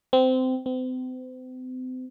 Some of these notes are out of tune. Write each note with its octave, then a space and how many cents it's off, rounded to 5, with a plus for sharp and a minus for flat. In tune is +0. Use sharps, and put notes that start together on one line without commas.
C4 -20
C4 -40